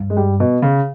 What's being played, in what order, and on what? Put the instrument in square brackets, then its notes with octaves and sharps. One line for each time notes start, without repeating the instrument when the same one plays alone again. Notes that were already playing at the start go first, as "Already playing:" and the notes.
Already playing: [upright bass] G2
[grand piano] G#3
G3
B2
C#3